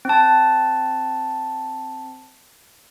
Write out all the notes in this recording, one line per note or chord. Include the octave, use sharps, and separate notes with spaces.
C4 A5